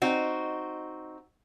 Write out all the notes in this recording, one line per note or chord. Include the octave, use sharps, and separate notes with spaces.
C4 D#4 F#4